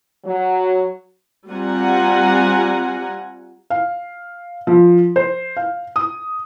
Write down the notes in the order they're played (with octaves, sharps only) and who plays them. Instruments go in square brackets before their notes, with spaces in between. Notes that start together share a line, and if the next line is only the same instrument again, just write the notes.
[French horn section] F#3
[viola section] G3 C4 F4 F#5 G#5 A#5
[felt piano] F5
F3
C5
F5
D#6